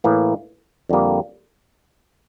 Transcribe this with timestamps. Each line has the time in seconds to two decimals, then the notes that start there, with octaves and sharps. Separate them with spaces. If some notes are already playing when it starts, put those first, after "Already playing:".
0.04 A2 E3 A#3
0.89 F2 D3 G3 A#3